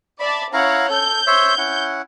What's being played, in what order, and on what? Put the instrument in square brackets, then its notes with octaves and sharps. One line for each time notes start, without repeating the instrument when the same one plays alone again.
[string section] D5 E5 A5 [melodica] B5
[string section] C#4 C#5 F#5 [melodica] E4 F5 A#5
[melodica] A4 [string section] G6
[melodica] C5 C#5 E5
C#4 E4 F#5